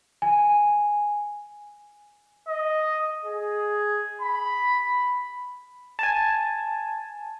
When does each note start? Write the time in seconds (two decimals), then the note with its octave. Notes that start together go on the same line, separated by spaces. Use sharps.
0.22 G#5
2.48 D#5
3.25 G#4
4.21 B5
5.99 G#5 A5